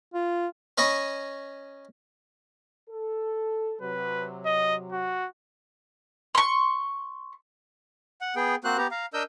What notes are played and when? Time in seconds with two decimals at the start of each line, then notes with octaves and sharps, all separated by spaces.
0.14 F4
0.78 C#4 C#5 D#5 B5 C#6 D#6
2.89 A4
3.81 C3 F#3 B4
4.45 D#5
4.92 F#4
6.35 C6 C#6
8.21 F#5
8.36 B3 G#4 G5
8.64 A#3 C4 F#4 C5 F#6
8.77 B3 G4 A#5
8.91 F5 A#5
9.14 D4 A#4 D#5 E6 G6